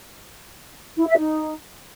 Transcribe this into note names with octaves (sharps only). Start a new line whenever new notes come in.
E4
E5
D#4